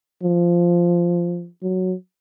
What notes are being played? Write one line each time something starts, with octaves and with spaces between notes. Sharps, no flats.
F3
F#3